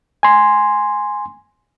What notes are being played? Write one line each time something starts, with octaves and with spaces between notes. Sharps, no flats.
G#5 C6